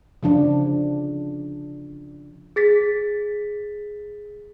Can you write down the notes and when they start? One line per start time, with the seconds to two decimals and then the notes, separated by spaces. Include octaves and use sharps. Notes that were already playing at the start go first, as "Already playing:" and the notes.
0.23 C#3 F3 D4
2.56 G#4 A6 B6